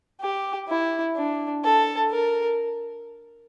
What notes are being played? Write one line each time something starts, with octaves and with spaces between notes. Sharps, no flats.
G4
E4
D4
A4
A#4